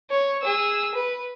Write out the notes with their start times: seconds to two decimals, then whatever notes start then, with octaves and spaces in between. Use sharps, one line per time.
0.11 C#5
0.42 G#4 E6
0.95 B4